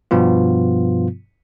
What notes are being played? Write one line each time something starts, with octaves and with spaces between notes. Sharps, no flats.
G2 B2 F3 B3 F4